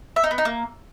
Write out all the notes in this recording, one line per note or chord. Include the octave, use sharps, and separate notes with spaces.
E5
D#4
B3
D#4
A#3